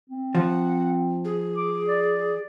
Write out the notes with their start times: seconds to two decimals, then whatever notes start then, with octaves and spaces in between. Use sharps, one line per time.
0.09 C4
0.35 F3 F#5
1.25 G#4
1.56 D6
1.87 D5